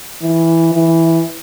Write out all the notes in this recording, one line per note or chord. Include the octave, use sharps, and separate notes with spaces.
E3
E3